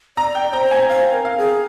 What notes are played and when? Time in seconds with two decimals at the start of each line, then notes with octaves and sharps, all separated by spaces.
0.17 D5 A#5
0.35 G5
0.53 C5 A#5
0.71 G#5
0.89 C5 F5
1.13 A#4
1.25 F5
1.38 G#4